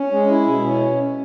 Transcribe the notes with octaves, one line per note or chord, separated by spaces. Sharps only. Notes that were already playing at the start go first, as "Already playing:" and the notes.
Already playing: C#4
G#3
E4
B2
C#4